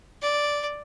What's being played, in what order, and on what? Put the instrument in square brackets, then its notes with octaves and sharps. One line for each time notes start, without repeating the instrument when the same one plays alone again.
[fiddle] D5